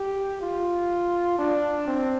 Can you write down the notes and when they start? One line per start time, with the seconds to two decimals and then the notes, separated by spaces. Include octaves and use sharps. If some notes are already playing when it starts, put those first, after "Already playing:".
Already playing: G4
0.41 F4
1.38 D4
1.87 C4